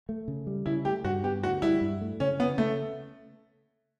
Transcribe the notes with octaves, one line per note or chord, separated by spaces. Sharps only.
A3
C#3
G3
C#3 E4
A3 G4
G2 F#4
B3 G4
D2 F#4
G3 E4
G2
A3
C#3 C#4
B3 C#4
C#3 A3